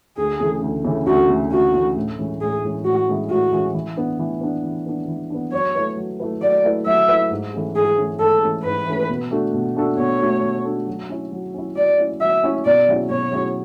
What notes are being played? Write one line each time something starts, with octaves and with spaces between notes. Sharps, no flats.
D2 G#4
C#3 E3 A3
D2
C#3 E3 A3
D2 F#4
C#3 E3 A3
D2 F#4
C#3 E3 A3
A2
E3 G#3 C#4
A2 G#4
E3 G#3 C#4
A2 F#4
E3 G#3 C#4
A2 F#4
E3 G#3 C#4
E3
B3 D4
E3
B3 D4
E3
B3 D4
E3
B3 D4
F#3 C#5
A3 E4 B4
F#3
A3 E4 B4
F#3 D5
A3 E4 B4
F#3 E5
A3 E4 B4
G#2
E3 A3 C#4 G#4
G#2 G#4
E3 A3 C#4 G#4
G#2 A4
E3 A3 C#4 G#4
G#2 B4
E3 A3 C#4 G#4
B2
A3 D4 F#4 A4
B2
A3 D4 F#4 A4
B2 C#5
A3 D4 F#4 A4
B2
A3 D4 F#4 A4
F#3
C#4 E4
F#3
C#4 E4
F#3 D5
C#4 E4
F#3 E5
C#4 E4
B2 D5
F#3 C#4 E4 G#4
B2 C#5
F#3 C#4 E4 G#4